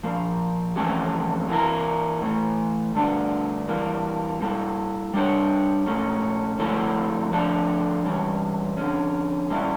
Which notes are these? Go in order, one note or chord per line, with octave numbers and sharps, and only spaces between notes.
A#2 F3 A#3
F2 E3 A3 C#4 G4
E3 A#3 E4 A#4
A2 E3 A3
G2 D3 A3 D4
E3 G3 A#3
G3 A#3 E4 A4
G3 D4 G4 C#5
A#2 A3 C#4
F2 D3 A3 E4 A4
D3 F3 A3 D4 A4
G2 E3 G3 C#4
F2 D3 G3 C#4
A#2 G3 C#4 E4